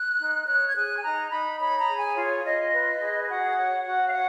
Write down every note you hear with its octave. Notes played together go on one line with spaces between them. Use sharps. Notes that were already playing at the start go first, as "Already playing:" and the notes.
Already playing: F#6
D#4
C#5 F#6
G#6
G#4 F#6
G#5
D#4 A#5
D#4 B5
C#5 B5
A#5
G#4
G#5
F4 C#5
F4 D#5
B4
G#4
F#4 F#5
C#5
F#4 F#5
F5
C#5 F#5